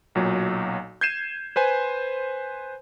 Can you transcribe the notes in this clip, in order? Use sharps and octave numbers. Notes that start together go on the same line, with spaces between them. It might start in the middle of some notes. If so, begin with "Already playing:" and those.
B1 A#2 F#3
G6 G#6 C7 D#7 E7
B4 C5 G#5